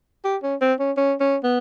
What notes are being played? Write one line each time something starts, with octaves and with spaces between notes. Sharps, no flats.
G4
C#4
C4
C#4
C#4
C#4
B3